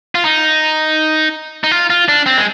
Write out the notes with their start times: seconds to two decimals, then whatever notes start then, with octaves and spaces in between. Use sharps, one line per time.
0.15 F4
0.25 D#4
1.64 D#4
1.71 F4
1.90 F4
2.09 D4
2.26 C4
2.37 G#3